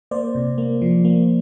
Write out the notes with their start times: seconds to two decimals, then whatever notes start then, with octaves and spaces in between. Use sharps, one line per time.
0.11 A#3 C5 D5
0.35 C3
0.58 A#3
0.82 F3
1.05 A#3